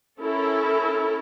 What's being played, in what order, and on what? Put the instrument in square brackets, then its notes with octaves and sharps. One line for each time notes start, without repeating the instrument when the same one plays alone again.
[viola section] C#4 E4 A4 A#4